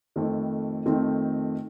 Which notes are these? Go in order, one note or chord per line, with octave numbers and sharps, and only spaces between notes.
F2 D#3 A3 C4
F2 D#3 A3 C4